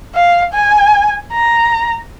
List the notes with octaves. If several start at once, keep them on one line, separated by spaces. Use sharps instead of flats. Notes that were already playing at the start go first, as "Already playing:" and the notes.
F5
G#5
A#5